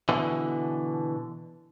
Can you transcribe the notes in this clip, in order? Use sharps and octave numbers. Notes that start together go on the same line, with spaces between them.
B2 D3 E3